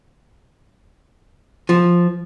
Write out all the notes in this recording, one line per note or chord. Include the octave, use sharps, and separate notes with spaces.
F3